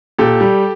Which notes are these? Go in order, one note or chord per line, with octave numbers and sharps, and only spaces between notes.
A#2 G4 A4
G3